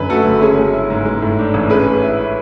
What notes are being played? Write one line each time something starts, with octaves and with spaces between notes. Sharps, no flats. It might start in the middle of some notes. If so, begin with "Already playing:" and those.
Already playing: F#2 D3 B4
A3 F#4 A4
F#1
C#4 G#4
G#3
E4
G#2
G#3
A2
D4
A1
C#4 G#4 B4
G#3
E4